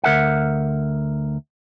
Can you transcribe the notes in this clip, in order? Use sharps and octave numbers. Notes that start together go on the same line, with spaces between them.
D2 A#4 E5 F#5